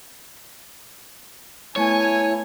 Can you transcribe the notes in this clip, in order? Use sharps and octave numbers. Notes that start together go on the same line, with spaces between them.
A3 B3 E4 A4 C#5 G#5